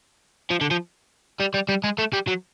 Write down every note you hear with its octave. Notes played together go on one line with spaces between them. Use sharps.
F3
D3
F3
G3
G3
G3
G#3
A3
G3
F#3